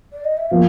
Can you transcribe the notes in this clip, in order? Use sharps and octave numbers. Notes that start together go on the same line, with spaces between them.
D5
D#5
E5
F3 A#3 F5